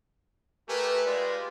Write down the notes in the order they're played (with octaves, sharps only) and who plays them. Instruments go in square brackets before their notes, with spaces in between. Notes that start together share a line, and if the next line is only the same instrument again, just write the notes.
[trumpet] A3 [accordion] G4 A#4 G#5 [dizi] B4
[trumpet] G#3 [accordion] F4 G4 D5